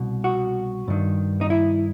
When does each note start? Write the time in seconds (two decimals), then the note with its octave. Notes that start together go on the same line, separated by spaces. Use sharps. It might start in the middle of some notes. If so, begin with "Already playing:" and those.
Already playing: C2 B2
0.24 F#4
0.88 G2 D#3
1.41 D#4
1.50 E4